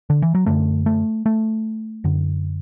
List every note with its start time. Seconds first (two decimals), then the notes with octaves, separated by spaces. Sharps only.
0.10 D3
0.22 E3
0.35 F#3
0.46 F#2 D3 A3
0.86 A3
1.26 A3
2.04 F#2 D3